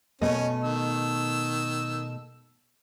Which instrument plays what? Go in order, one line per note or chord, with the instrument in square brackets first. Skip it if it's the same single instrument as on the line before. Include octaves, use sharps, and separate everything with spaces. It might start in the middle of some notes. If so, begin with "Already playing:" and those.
[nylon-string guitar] B2 A3 D#5 [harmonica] C#4
[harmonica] D#3 E6